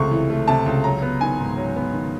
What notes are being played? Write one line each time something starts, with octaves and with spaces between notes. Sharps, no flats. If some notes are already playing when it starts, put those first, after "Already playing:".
Already playing: C#2 C3 A3 C#6
E3
A3
C3 A5
C#2
F#3 A#5
B3
D#3 G#5
G#2
F#3
B3
D#3